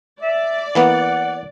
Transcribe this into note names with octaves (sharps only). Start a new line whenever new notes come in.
D5 E5
E3 A#3 B3 F#5